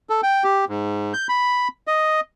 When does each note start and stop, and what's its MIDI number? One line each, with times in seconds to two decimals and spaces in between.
0.09 0.21 69
0.23 0.44 79
0.44 0.65 67
0.69 1.13 44
1.14 1.27 91
1.29 1.68 83
1.87 2.21 75